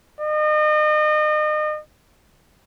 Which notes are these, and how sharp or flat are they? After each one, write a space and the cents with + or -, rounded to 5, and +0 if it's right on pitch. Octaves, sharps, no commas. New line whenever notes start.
D#5 -35